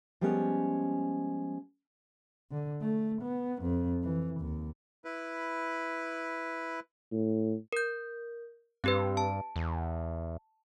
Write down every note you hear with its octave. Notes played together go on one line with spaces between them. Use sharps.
F3 G3 G#3 B3 C#4
D3
A3
B3
F2
E3
D#2
E4 B4
A2
A#4 G6
G2 C4 G4 B4
A5
E2